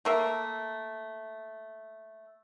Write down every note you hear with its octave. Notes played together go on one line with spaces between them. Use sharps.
A3 A#3 E5